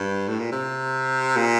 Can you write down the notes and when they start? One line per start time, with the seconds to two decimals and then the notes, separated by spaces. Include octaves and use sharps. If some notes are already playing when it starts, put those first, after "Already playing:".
Already playing: G2
0.28 A2
0.40 A#2
0.52 C3
1.37 A#2